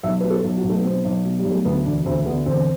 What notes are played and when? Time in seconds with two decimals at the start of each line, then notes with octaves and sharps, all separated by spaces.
0.03 B1 E5
0.20 B2 B4
0.30 A4
0.44 B1
0.57 F#4
0.64 B1
0.69 A3
0.77 B3
0.84 B2 C4
1.04 B1
1.25 B2
1.39 G3
1.45 B1
1.52 A3
1.65 D2 B3
1.85 E1 D4
2.06 D2 C4
2.26 D3 B3
2.46 E1 C4